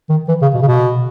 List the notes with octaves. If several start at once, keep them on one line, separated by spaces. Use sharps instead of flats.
D#3
E3
C#3
B2
C#3
B2